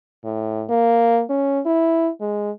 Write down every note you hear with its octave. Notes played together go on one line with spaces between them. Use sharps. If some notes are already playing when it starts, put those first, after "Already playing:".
A2
A#3
C#4
E4
G#3